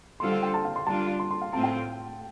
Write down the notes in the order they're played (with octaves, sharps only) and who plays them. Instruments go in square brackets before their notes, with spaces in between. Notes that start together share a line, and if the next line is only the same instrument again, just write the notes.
[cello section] D3 G3 C4 F4 A4 [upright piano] C6
[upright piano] F5
G5
A5
F5
C6
[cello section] G3 D4 F4 [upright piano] A5
[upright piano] C6
C6
F5
[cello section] A2 A3 C4 F4 [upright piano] A5
[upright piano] G5